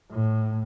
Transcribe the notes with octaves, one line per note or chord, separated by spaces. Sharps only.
A2